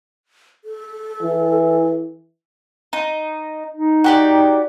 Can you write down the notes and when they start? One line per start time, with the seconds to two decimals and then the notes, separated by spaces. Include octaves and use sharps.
0.65 A4
1.22 E3
2.93 D#4
3.73 D#4
4.04 F#4 G4 D5